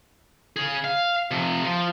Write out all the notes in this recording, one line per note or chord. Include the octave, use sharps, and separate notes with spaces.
C#3 G#4
F5
C3 F3
F3